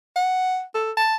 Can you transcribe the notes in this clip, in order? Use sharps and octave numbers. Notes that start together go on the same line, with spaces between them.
F#5
A4
A5